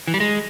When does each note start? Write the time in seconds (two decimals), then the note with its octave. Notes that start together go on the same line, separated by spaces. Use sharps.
0.07 E3
0.14 G3
0.20 G#3